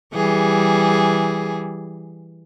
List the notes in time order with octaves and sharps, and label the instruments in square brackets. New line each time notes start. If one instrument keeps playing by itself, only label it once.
[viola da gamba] E3 G3 G#4